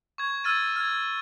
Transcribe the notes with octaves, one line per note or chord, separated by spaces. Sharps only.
C#6 G#6
E6 F6 G#6 A6 D#7
F6 G#6